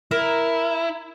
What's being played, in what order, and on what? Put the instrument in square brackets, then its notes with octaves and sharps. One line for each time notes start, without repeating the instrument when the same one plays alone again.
[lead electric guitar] E4 [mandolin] A#4